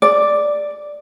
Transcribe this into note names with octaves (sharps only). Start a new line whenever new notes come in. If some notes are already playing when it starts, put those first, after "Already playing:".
D5